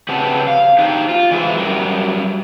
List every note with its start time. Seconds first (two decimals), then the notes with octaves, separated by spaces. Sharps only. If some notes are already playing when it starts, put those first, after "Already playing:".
0.09 C#3 C4 G4 B4 F#5 A5
0.47 F5
0.79 D4 D#4 G4 C5
1.09 F4
1.31 E3 G#3 C#4 D4 E4 C5
1.57 F#2 G3 A#4